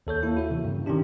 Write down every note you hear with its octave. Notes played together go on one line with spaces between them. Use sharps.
D#2 A4 C#5 G6
A#3 E4
F#4 E5
C3 E3
G2 C#3
C3 D#3 C#4 D4 G4